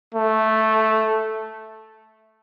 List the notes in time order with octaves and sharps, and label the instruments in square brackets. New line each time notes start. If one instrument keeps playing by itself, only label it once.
[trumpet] A3